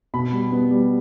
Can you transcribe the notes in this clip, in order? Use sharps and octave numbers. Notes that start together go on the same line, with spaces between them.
B2 B5
G3
B3
G3